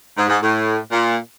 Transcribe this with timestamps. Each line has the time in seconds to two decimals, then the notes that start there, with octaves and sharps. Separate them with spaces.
0.17 G#2
0.29 G#2
0.43 A2
0.92 A#2